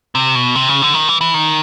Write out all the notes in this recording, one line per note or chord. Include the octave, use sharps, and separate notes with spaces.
C3
B2
C3
C#3
D3
D#3
E3
E3
D#3